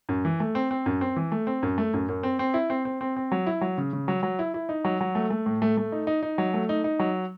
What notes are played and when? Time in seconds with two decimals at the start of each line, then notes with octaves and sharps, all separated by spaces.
0.09 F#2
0.25 E3
0.40 A3
0.55 C4
0.71 C4
0.86 F#2
1.01 C4
1.16 E3
1.32 A3
1.47 C4
1.63 F#2
1.78 A3
1.94 F#2
2.09 F#2
2.23 C4
2.39 C4
2.54 E4
2.70 C4
2.85 C4
3.01 C4
3.16 C4
3.32 F#3
3.47 E4
3.61 F#3
3.78 C#3
3.93 C#3
4.08 F#3
4.23 F#3
4.39 E4
4.54 E4
4.69 D#4
4.85 F#3
5.01 F#3
5.15 A3
5.30 A3
5.46 A2
5.62 A3
5.77 A3
5.92 D#4
6.07 D#4
6.23 D#4
6.38 F#3
6.54 A3
6.69 D#4
6.84 D#4
6.99 F#3